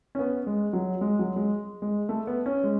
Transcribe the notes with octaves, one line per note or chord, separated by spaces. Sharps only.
C#4
B3
G#3
F#3
G#3
F#3
G#3
G#3
A3
B3
C#4
G#3